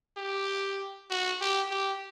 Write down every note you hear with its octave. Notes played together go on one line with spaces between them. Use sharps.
G4
F#4
G4
G4